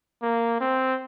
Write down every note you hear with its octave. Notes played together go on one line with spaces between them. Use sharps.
A#3
C4